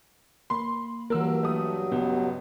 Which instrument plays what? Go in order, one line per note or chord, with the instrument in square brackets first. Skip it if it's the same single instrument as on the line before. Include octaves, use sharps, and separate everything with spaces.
[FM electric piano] A#3 B5 [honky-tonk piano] C6
[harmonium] G2 F#3 [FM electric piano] E3 A#3 [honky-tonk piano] A#4 E6
[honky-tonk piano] A3 D#6
[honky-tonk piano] C#2 [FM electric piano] B3